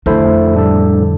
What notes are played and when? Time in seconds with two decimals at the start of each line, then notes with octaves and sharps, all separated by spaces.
0.06 F2 D3 A3 E4 A4 C5
0.54 A2 G3 D4 A4
1.02 D3